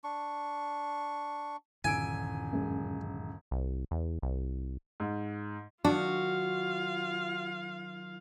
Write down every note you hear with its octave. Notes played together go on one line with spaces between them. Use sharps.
D4 C#6
D#1 G2 D3 E3 G#5 E6 D7
F#2 G#3
C2
E2
C2
G#2
D#3 F#3 D4 F4 F#4 F5